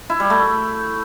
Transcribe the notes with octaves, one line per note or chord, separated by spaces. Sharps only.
E4
G3
A3